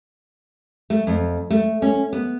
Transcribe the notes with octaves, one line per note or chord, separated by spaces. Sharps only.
A3
F2
A3
C#4
B3